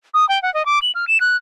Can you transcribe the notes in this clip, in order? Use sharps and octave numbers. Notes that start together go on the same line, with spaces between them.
D#6
G5
F#5
D#5
D6
F#7
F6
E7
F#6